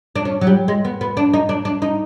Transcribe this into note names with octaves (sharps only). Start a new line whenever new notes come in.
D4
C#4
F#3
G3
G#3
B3
B3
D4
D#4
D4
D4
D#4